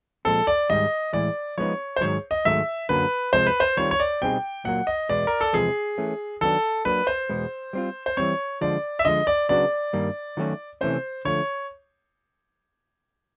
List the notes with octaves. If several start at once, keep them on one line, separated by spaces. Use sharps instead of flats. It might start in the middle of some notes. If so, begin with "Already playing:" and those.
A#2 F3 G#3 C4 A4
D5
G#2 D#3 G3 D#5
A2 E3 G#3 D5
F3 G#3 B3 D#4 C#5
C5
G#2 D#3 F#3 C#5
D#5
G#2 D#3 F#3 A3 E5
F#2 D3 F#3 A#3 B4
C3 F3 G#3 C5
B4
C5
D#3 G3 C4 F4 C#5
C#5
D5
B2 G3 C4 D#4 G#4 G5
A#2 F#3 A#3 F#5
D#5
E2 B2 G#3 B3 D5
A#4
A4
E2 C3 F3 G#3 B3 G#4
E3 A3 C#4
D#3 F#3 B3 D4 A4
F#3 A#3 D4 B4
C5
E2 B2 G#3 B3
G3 C4 F4
C5
E3 G3 C4 C#5
D3 F3 G#3 D5
E5
D3 F3 G#3 D#5
D5
C#3 F#3 B3 D4 F#4 D5
G2 D#3 G3 A#3
D#3 F#3 A3 C#4 F#4
C3 E3 A3 C#4 C5
D3 F3 A3 C#5